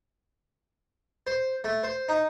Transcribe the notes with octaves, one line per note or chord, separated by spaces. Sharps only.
C5
A3
C5
D#4